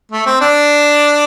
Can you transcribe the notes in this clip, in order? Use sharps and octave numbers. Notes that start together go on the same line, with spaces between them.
A3
C4
D4